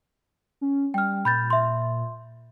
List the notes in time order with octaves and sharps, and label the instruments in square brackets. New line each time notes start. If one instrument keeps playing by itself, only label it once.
[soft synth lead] C#4
[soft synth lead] G3 [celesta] G5 F6
[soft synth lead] A#2 [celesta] B5 G6 A6
[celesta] E5 C6